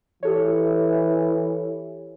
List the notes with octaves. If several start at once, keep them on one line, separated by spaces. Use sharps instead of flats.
E3 G4 A4 C#5